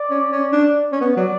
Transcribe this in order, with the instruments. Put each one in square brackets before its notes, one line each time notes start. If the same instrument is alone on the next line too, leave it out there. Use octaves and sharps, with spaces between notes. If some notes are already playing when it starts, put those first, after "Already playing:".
Already playing: [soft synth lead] D5
[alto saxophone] C#4
C#4
D4
C#4
B3
[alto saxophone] F#3 [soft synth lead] D5